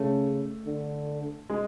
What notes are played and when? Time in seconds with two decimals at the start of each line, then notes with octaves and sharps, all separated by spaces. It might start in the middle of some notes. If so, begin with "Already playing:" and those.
Already playing: C#3 A3
0.66 D3
1.50 G#3